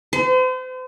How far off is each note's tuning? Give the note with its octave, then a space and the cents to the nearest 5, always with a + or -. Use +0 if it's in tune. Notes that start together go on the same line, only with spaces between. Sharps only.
C5 -40